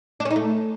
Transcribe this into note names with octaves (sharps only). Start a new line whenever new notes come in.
D4
C#4
D#4
A3